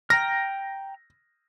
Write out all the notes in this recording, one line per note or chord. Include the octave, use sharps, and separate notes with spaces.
G5 A#5 F6 A#6